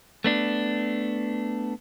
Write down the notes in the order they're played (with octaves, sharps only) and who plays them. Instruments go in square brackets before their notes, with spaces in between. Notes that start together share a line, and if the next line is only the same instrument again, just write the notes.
[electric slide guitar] A3 B3 D4